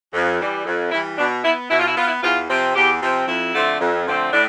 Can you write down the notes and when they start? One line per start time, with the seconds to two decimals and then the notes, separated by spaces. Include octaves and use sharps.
0.13 F2
0.40 E3 G3
0.66 F2
0.92 E3 G3 E4
1.18 B2 D4
1.44 B3 E4
1.70 B2 E4
1.79 F4
1.87 E4
1.96 B3 F4
2.05 E4
2.23 E2 F4
2.49 C3 F3 C4
2.75 E2 G4
3.01 C3 F3 C4
3.27 F2 E4
3.53 D3 F3 A3 C4
3.80 F2
4.06 D3 F3 A3 C4
4.32 A2 D4